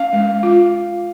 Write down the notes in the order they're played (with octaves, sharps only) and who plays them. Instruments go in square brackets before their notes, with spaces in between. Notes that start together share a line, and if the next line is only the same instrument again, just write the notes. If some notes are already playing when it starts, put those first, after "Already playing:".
Already playing: [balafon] C#4 [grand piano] F5
[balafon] G#3
F4